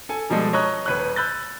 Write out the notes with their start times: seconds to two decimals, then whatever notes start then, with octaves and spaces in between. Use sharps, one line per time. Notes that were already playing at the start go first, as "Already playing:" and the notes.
0.09 A4 G#5
0.30 B2 F3 G3 G#3 A4
0.53 C#5 D#5 A#5 C#6 F#6
0.86 D#1 B4 C#5 F#6
1.16 B5 E6 F#6 G6 A6